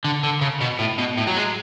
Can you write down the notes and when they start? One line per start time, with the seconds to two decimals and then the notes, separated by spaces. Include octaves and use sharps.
0.05 D3
0.23 D3
0.41 C#3
0.61 B2
0.79 A2
0.98 B2
1.18 A2
1.27 F#3
1.37 G#3